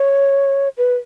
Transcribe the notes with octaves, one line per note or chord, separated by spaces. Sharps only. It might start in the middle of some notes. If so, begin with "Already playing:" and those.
Already playing: C#5
B4